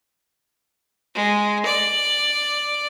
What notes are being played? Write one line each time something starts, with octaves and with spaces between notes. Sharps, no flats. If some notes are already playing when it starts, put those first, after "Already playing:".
G#3
D5